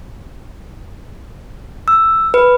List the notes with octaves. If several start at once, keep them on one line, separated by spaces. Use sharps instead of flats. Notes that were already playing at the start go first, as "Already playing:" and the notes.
E6
B4